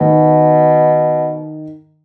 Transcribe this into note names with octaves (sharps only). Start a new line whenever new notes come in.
B2 D#3